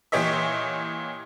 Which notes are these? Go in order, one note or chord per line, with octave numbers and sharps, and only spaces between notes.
A#2 E3 G4 C#5 D#5 E5